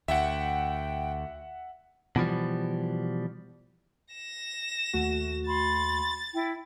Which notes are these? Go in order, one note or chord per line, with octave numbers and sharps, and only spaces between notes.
D2 E5 F#5 G5
B2 E3 F3 G3
A#6 E7
D#2 A3 F#4
B5 C6 A6
E4 G5